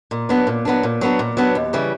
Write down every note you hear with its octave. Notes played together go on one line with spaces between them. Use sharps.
A#2
F#3 B3 D4
A#2
F#3 B3 D4
A#2
F#3 B3 D4
A#2
F#3 B3 D4
D#2
C#3 E3 G3